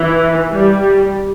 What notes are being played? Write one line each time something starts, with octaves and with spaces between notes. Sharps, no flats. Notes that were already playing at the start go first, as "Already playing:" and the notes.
Already playing: E3
G3